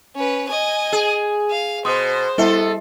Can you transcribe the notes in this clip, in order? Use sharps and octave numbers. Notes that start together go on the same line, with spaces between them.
C#4 B4
D#5 G#5
G#4
F5
B2 C5 C6 D#6
G3 B3 E4 A4 E5